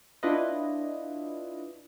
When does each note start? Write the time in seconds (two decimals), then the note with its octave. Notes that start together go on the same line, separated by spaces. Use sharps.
0.23 D4 E4 F4 B4 D#5